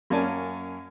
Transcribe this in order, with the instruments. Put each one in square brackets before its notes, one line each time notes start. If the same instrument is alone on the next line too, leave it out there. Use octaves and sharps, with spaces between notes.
[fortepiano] F#2 A#3 C#4 D5 G#5 A5